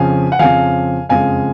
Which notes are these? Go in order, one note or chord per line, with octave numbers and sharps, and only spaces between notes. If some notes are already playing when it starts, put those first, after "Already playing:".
Already playing: F2 C#3 F3 F5 G#5
F#5
F2 C#3 F3 F5 G#5
F#1 F2 C#3 G#3 F5 G#5